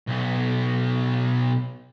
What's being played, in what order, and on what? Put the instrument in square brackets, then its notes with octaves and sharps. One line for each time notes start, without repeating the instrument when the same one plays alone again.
[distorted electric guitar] B1 B3